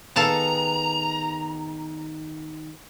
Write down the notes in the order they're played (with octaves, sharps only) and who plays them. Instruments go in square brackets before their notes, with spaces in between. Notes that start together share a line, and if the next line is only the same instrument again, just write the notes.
[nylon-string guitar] D#3 B3 G#4 [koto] A4 F5 A5 [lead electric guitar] A#5